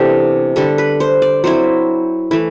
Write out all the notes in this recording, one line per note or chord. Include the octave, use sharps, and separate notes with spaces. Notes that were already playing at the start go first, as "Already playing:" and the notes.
Already playing: C3 E3 B3 D4 G4 A4
D3 G3 D4 A4
B4
C5
D5
F#3 C4 E4 C5
E3 A3 E4